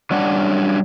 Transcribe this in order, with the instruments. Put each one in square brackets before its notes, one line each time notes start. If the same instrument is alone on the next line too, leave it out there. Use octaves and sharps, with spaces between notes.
[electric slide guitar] F#3 G3 C#4 D4 F#5